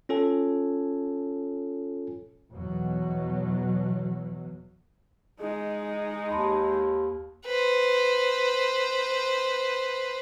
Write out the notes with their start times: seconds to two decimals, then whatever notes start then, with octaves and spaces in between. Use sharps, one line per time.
0.09 C#4 F4 A4 C#5 G#5
2.52 E2 B2 F#3
5.40 G#3 D#4 G#4
6.29 D#2 A5 B5 C6
7.46 B4 C5